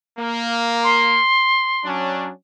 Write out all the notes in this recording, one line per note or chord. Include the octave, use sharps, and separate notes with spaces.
A#3
C6
F#3 C#4 D4